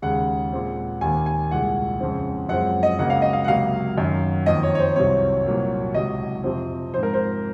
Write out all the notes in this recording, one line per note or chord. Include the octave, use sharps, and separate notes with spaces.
D#2 C#3 G#3 F#5
A#2 G#3 C4
D#2 D#3 A#3 G#5
G#5
C2 A#2 G#3 F#5
F2 C#3 G#3 C4
F#2 F3 G#3 C4 F#5
D#5
C#2 C#3 F#3 A#3 F#5
F5
D#5
F5
F#5
C#2 C3 F#3 A#3 F5
F#2 D#3 F#3
F2 D#3 A#3 D#5
C#5
C#5
C5
C2 C3 F#3 C4 C#5
C2 A#2 F#3 A#3
C#2 C3 F#3 D#5
F2 C3 F3 C4
G#2 F3 C4 C5
A#4
C5